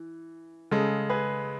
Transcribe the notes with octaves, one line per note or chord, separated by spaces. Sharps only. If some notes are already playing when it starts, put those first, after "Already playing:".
Already playing: E3
C#3 G#3 A4
G#4 B4